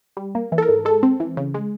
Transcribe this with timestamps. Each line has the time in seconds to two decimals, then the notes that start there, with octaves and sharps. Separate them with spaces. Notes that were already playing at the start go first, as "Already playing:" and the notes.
0.17 G3
0.35 A#3
0.52 E3
0.58 A4
0.62 A#4
0.69 G#2
0.85 G#3 A4
1.03 C4
1.20 E3
1.37 C#3
1.54 G#3